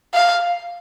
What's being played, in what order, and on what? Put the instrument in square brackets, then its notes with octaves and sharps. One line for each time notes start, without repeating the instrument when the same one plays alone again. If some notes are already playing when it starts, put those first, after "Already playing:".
[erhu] F5